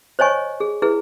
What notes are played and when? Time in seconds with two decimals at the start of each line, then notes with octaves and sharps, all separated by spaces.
0.19 C5 C#5 D#5 G#5 C#6
0.60 G#4
0.82 E4 G#4 B4